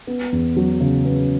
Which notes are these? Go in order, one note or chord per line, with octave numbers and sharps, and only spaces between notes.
B3
E2
F#3
C#3
B3